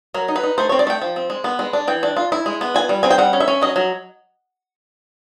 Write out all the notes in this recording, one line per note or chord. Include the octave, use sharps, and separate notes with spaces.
F#3 A#4
D#4
B4
D#4
A3 C5
C4 C#5
D5
A3 G5
F3
C4
G#3
B3
G#3
D4
E3 G5
D4
F4
E4
G#3
B3
F4 G#5
G3
C4 G#5
G5
G3 F#5
C#4
E5
C#4
F#3 D#5
F#3